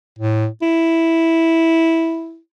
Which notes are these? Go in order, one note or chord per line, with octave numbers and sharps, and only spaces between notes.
A2
E4